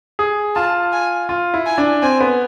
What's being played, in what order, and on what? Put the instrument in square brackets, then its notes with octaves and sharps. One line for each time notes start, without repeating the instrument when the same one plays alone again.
[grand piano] G#4
[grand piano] F4 [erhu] A5
[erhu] G#5
[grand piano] F4
E4
[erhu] G#5
[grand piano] D4
[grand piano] C4 [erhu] G#5
[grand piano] B3